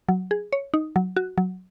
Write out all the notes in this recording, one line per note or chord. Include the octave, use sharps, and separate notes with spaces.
F#3
G#4
C#5
D#4
F#3
F#4
F#3